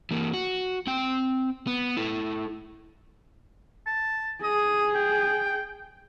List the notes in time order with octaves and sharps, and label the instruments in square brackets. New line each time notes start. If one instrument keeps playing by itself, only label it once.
[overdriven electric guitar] E3 A#3
F#4
C4 G5
B3
E4 A4
[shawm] A5
[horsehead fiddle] G#4 [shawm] D#6
[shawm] G5